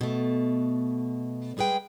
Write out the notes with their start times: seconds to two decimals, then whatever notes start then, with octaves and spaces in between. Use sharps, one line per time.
0.01 B2 A3
1.57 G3 G#3 G#4 B4 G5